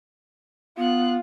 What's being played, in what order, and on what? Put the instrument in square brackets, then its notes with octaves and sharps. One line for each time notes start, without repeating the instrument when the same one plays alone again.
[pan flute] B3 [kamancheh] F4 F#6